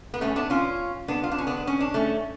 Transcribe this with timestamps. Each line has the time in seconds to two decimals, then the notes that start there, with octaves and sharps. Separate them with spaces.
0.14 B3
0.21 A3 C#4
0.36 B3 D4
0.50 C#4 F4
1.08 B3 D4
1.23 F4
1.32 D4
1.38 C#4
1.47 B3 D4
1.67 C#4
1.80 D4
1.94 A3 C#4